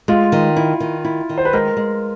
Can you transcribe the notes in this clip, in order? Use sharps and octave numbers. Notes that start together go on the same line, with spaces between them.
G#3 F4
D#3
E4
D#3
E4
D#3
C5
B4
G#3 A#4
G#3